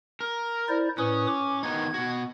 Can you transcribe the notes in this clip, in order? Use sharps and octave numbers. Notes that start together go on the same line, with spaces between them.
A#4
E4 C5 D5
A2 C#4 B4 D#6
D6
D#3 B3 D#4 G#6
B2 F#4